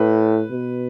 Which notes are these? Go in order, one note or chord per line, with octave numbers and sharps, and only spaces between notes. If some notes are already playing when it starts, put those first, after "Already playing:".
Already playing: A2 B4
B2